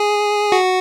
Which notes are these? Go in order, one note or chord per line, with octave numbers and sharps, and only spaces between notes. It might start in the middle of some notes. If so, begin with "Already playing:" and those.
Already playing: G#4
F#4